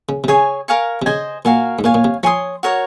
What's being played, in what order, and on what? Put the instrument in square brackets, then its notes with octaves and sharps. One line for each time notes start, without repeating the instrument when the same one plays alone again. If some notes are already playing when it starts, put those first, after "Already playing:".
[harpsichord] C#3
C3
[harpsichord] C#3 [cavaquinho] G#4 C#5 G#5
[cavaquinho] A#4 F5 G#5 C#6
[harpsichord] C3
[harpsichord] C#3 [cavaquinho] C5 D#5 G#5
[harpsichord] A#2 [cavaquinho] F#4 A#4 F5 G#5
[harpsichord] G#2
[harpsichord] A#2 [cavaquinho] C#5 F5 G#5
[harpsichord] A#2
C3
[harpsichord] F3 [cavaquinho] C#5 G#5 C6 D#6
[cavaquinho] F#4 A#4 C#5 F#5